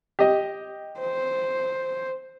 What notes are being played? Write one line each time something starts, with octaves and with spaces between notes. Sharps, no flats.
G4 D#5
C5